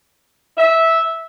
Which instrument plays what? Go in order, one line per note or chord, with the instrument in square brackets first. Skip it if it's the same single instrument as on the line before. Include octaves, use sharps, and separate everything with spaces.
[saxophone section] E5